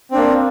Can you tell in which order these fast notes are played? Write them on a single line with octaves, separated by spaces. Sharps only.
C4 D4 A#3